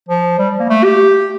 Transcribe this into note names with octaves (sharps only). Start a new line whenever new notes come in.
F3
G3
A#3
A3
G4